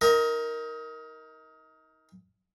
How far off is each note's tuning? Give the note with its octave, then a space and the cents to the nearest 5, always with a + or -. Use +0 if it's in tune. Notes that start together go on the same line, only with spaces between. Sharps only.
D#4 +30 A#4 +0